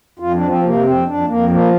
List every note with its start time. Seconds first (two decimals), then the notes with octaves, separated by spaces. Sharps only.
0.19 F2 F4
0.34 D4
0.41 F3
0.48 C4
0.63 C3 A#3
0.84 F2 C4
1.06 F2 D4
1.27 F2 A#3
1.49 F3 A#3